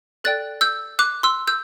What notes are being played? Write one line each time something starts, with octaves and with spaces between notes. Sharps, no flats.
A4 D5 G5 F#6 A6
E6 G6
D6 F#6
C6 E6
E6 G6